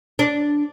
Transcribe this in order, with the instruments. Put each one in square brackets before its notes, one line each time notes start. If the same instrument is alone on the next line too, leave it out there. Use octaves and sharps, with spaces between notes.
[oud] D4